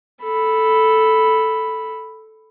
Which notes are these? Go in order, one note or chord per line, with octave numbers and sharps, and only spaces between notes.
A4 B5